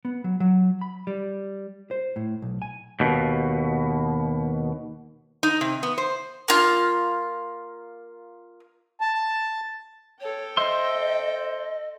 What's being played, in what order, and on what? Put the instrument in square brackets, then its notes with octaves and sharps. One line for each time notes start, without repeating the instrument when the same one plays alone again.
[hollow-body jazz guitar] B3
F#3
F#3
B5
G3
C5
A2
B1
G#5
[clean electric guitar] D#2 B2
[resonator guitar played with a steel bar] D#4
C3
B3
C5
[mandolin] A#3 F4
[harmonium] A5
[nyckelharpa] A4 G5 [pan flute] C#5
[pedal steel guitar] C5 E5 C6 [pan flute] D#5